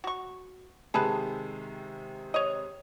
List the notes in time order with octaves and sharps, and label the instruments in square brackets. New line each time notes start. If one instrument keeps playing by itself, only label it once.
[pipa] F#4 C#6
[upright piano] C3 D#3 G#3 [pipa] G#4 A4 B4
[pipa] C#5 D#5